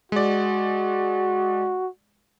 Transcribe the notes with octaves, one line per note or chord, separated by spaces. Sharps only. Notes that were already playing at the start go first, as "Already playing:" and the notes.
G#3 F#4 D5